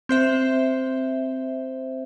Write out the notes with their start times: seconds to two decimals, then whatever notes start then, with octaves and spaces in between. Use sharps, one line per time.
0.09 C4 C5 E5